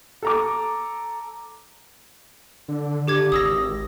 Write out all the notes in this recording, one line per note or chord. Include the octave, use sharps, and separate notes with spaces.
A4 A#5 D6
D3
D3 G4 D6 G#6
G#1 D#6 E6 A#6